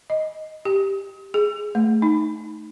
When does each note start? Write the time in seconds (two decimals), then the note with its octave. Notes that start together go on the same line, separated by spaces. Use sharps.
0.10 D#5
0.65 G4
1.34 G#4
1.75 A3
2.02 D#4